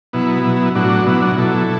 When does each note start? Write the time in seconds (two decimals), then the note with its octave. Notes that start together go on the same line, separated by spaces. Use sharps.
0.13 B2 F#3 B3 E4
0.44 B2 F#3
0.75 A2 F#3 D4 F#4
1.06 B2 F#3 B3 E4
1.22 D4 F#4
1.38 B2 F#3 E4 A4